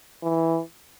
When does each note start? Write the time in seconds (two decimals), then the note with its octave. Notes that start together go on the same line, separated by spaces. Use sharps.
0.23 E3